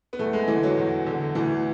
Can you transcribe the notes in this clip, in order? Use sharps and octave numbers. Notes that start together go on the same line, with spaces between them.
B3
E2 A3
G#3
D3 E3
F#3
E2
D3
D2 E3